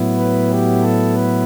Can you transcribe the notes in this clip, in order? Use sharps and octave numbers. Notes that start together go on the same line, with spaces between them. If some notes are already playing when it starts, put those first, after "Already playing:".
Already playing: A2 F#3 B3 E4
B4
G4
A4
B4